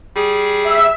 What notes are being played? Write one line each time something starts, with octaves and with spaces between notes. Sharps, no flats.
G3 G#4
E5